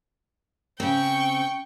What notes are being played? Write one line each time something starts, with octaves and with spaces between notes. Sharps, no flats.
C#3 C4 G5 C#6